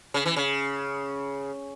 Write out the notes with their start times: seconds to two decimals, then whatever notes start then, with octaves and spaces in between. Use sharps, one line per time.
0.14 C#3
0.26 E3
0.36 C#3